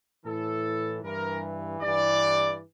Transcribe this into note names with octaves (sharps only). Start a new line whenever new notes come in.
A2 E3 A4
G2 E3 A#4
G2 E3 D5